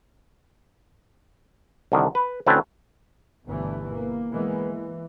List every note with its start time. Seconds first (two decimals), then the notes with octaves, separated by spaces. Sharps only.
1.92 C2 D3 D#3
2.15 B4
2.47 D2 A2 C4 C#4 B4 A5
3.47 G1 B2 E3 A3
3.92 A#3
4.32 E3 G#3 A#3 B3
4.68 E3